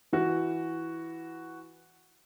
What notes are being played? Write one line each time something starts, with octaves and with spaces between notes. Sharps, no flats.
E3 F#4